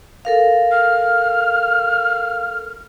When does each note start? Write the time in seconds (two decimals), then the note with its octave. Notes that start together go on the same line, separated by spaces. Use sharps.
0.25 A4 A#4 F5
0.72 F6